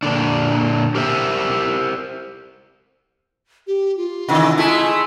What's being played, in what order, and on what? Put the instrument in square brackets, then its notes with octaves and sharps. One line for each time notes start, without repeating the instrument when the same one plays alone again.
[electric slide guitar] A#2 D3 D4
G4 A#4 C5 E5
[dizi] G4
F4
[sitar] C3 D#3 E3
G#3 A3 E4